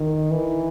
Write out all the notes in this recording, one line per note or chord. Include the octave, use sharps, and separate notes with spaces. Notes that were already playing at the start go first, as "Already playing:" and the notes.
Already playing: D#3
E3